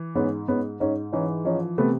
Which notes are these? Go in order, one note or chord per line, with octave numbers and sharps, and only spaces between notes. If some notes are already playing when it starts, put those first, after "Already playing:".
Already playing: E3
G#2 B3 C#4
G#2 B3 C#4
G#2 C#4 D#4
E3 C#4 D#4
F3 C#4 D#4
C3 A3 B3